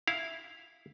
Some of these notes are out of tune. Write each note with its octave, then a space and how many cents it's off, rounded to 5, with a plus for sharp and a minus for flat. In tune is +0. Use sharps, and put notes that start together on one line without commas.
E4 +0 F5 +0